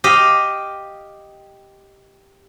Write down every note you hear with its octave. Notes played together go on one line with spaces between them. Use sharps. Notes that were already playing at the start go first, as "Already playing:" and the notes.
G4 D#5 F5